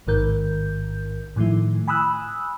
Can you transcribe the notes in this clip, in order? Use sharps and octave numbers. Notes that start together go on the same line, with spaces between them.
A1 G#2 D#3 A#4 G6
A2 D#3 F3 A3 E4
G#5 B5 D#6 E6 F#6